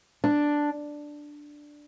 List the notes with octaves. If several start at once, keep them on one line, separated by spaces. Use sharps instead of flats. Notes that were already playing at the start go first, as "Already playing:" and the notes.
D4